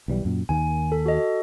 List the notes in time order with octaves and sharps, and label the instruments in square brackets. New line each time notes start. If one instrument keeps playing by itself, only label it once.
[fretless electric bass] B1 E3 G3
F#2 A#2
[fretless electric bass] D#2 D#3 A#3 [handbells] G#5
[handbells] A4
F#4 A4 D#5